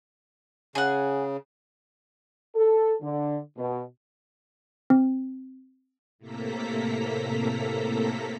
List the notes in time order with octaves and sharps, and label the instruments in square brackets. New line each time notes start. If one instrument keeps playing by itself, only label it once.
[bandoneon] C#3 [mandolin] G#4 F#5
[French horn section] A4
D3
B2
[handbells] C4
[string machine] A2 C3 A#3 A4 A#5 B6